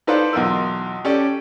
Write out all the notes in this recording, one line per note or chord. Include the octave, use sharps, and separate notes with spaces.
D#4 A4 B4 C5 D5 F5
B1 E2 F4 A#4 E6
C#4 G4 A4 D5